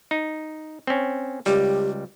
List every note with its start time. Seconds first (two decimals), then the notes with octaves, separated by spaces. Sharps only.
0.11 D#4
0.87 C4 C#4
1.46 C#2 G3 G4